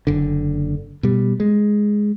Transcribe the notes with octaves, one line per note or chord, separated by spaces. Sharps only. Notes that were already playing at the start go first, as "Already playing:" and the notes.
F#1 D3
B2 G3
G#3